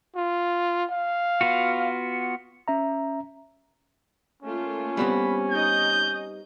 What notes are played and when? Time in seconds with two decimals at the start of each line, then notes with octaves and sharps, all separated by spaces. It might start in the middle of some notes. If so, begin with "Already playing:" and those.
0.16 F4
0.90 F5
1.41 B3 F4 F#4
2.68 C#4 E5 A#5
4.43 A3 A#3 C#4 F4
4.97 G3 B3 C4 B5
5.52 D#4 D#5 G6